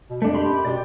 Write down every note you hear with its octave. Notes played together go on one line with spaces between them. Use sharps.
B2
F2 A3 D4
G4 B5 C6
F#2
B2 G4 D5